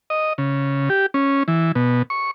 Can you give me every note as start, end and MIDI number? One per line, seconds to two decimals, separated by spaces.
0.10 0.33 75
0.38 0.89 49
0.89 1.06 67
1.14 1.43 61
1.48 1.72 52
1.75 2.02 47
2.10 2.31 85